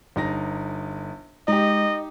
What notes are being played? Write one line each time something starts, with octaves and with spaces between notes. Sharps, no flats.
G1 D#4 A#6
G#3 D#4 G4 D#5